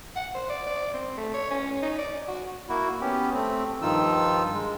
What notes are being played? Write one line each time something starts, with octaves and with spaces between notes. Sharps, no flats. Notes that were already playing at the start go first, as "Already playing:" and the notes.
F#5
C5
D5
D5
C4
A3
C#5
C#4
D#4
D5
F#4
A#3 E4 F#4
B3 C#4 G4
A3 C4
G2 D#3 F3 D#4 F4 E6
G#3